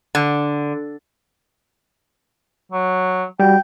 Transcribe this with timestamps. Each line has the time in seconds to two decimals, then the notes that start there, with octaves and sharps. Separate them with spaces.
0.15 D3
2.72 F#3
3.40 G3 F#4 G5